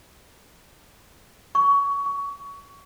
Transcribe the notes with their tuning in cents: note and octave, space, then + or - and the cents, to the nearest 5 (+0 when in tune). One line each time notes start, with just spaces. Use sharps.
C#6 +20
C#6 +25